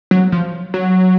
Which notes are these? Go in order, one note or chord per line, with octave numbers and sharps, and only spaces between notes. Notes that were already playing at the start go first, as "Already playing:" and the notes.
F#3
F3
F#3